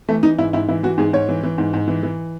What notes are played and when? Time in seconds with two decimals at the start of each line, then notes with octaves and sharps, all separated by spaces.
0.08 E3 A3
0.23 E3 D#4
0.38 G#2 E4
0.53 G#2 E4
0.68 E3 E4
0.83 E3 F#4
0.98 G#2 G#4
1.13 G#2 C#5
1.29 E3
1.43 E3
1.58 G#2
1.74 G#2
1.88 E3
2.03 E3